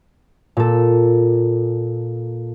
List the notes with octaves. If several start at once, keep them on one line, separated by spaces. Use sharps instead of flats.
A#2 A4